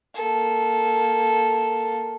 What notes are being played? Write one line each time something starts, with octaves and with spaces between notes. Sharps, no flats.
A#3 A4